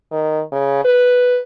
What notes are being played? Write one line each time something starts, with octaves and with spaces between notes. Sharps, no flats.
D#3
C#3
B4